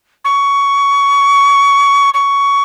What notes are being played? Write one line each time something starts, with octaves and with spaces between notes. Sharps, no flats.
C#6
C#6